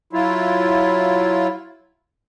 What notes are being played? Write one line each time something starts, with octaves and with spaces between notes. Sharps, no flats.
F#3 E4 F4